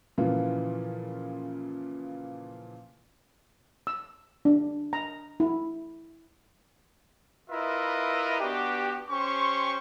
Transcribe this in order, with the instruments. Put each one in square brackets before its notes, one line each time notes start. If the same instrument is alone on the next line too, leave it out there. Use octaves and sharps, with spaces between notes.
[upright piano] A#2 C#3 E3 F3 F4
[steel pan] E6
D4
A#5
E4
[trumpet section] E4 F4 A#4 B4 D#5 E5
B3 D4 F#4 G4
C#4 G4 C5 C6 C#6